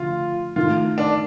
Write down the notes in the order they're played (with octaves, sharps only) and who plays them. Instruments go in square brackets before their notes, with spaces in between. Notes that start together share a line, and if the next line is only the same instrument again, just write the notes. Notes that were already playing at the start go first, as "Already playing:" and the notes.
Already playing: [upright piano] D3 F3 A3 [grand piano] F4
[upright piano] D#3 A3 D#4 [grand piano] F4
[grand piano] D4